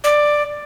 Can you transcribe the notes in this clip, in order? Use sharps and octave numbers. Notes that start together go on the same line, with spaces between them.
D5